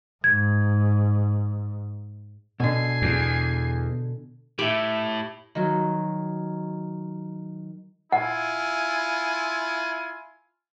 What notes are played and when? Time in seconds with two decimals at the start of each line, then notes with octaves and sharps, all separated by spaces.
0.24 G#2 G#6
2.60 B2 D3 G#5 C7
3.02 E2
4.59 A2 G4 E5
5.55 D#3 F#3
8.12 E4 F4 F#5 G#5